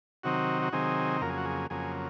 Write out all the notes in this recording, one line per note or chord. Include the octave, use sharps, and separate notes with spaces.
C3 D#3 F#3 C4 D#4 F#4
F#4
C3 D#3 F#3 C4 D#4 G#4
F2 C#3 F#3 A#3 A#4
G#4
F#4
G#4
F2 C#3 F#3 A#3 G#4